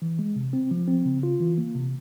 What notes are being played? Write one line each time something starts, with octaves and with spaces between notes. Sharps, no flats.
E3
G#3
C3
C4
F3
C4
C#3
F4
E3
A#3
C3